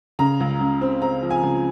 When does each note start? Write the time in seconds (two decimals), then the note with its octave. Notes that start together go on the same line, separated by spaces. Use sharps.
0.19 C#3 A#5
0.40 C#2
0.61 C#2
0.81 C4
1.02 C4 A#5
1.22 F3
1.31 G#5
1.43 C#2